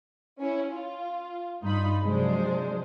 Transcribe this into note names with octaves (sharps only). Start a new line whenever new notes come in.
C#4 E4
F4
G2 D#4 F4 B5
C3 F3 F#3 G#3 D4 C5